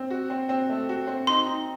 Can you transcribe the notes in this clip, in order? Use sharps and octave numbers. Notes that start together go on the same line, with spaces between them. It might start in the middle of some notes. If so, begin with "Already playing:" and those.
Already playing: C4
F#4
C4
C4
A3
F#4
C4
D#4 C6
D#4